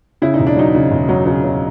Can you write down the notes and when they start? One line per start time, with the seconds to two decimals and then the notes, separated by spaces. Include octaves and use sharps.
0.22 C#3 E4
0.34 D#4
0.40 E1
0.47 D4
0.56 F#3 D#4
0.75 C#3
0.91 E1
1.09 F#3
1.26 C#3
1.44 C#3